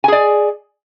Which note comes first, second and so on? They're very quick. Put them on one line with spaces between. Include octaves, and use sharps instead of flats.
G#5 G#4 D5